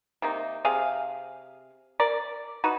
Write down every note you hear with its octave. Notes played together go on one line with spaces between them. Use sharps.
C3 A#3 D#4
C3 G#4 F5
A#4 D5
D#4 F#4 B4